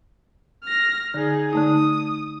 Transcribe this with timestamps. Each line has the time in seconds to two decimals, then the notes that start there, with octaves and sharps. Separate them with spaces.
0.64 F6 A#6
1.14 D3 D#4 G#4
1.53 D3 A3 D#4 D#6